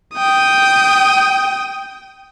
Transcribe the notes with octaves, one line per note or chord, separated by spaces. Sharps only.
G5 D#6